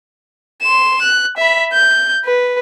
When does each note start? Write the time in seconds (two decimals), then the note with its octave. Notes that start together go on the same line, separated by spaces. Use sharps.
0.62 C6 E7
1.02 F#6
1.38 E5 B5
1.73 G6
2.25 B4